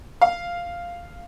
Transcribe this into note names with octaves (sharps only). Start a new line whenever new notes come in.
F5